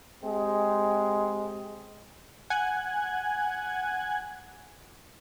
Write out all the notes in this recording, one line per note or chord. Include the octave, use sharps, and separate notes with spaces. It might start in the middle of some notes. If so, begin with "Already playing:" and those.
G#3 C4 G4
F#5 G#5 F#6 G#6